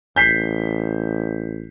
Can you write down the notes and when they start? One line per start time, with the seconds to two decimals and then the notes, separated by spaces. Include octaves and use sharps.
0.16 A1 G6 B6 C7